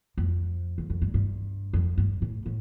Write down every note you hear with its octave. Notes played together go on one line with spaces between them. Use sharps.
F2
E2
F2
G2
G2
F2
G2
A2
A2